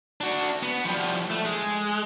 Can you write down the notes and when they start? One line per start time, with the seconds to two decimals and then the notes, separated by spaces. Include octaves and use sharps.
0.21 D4 F#4
0.62 B3
0.85 F3 G3
1.30 A3
1.45 G#3